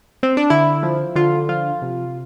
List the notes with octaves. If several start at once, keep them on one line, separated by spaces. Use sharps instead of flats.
C4
D4
D3 E4
F3
D3 F4
F3 F4
C3